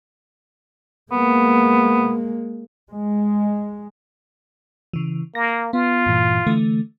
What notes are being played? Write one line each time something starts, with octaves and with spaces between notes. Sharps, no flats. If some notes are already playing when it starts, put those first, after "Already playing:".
G#3 A#3 B3
G#3
C#3 E3
A#3 A#6
B3 F4
G2 A#2 E3
D3 E3 A3